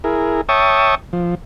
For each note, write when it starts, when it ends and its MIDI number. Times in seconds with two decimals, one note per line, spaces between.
0.04 0.41 64
0.04 0.41 68
0.04 0.41 70
0.49 0.95 73
0.49 0.95 76
0.49 0.95 79
0.49 0.95 81
0.49 0.95 85
0.49 0.95 87
1.13 1.35 53